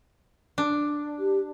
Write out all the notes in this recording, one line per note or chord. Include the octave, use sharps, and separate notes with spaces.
D4
G4